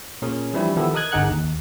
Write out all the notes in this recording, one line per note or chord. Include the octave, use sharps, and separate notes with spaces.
A#2 C#4 G#4 A#4
E3 F3 G3 C4 D4 E4
D#3 F3 B3 E4 G4 A4
A#4 D#5 D#6 F#6 G#6
G1 D3 D#4 G#4 F#5 F#6
D#2